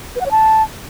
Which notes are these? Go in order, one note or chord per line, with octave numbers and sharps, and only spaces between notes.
B4
F#5
C#5
A5